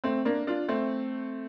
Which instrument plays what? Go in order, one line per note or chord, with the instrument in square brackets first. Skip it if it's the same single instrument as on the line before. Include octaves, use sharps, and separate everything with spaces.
[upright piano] A3 C4
A#3 D4
D4 F4
A3 C4